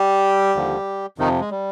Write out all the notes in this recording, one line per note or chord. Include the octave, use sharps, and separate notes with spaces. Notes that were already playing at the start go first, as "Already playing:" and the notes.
Already playing: G3 G4
D#2 D3 F3
F2 C3 D#3 F3 D#4
G#3
G3